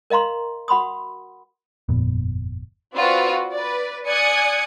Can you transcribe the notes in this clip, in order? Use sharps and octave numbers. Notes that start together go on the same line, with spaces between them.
A#4 D#5 F5 A#5 C6
F#4 F#5 B5 C6 D#6
G1 F2 A#2 B3
C4 F4 F#4 B4 D5
B4 D5
D5 G#5 D#6 F#6 G#6 C#7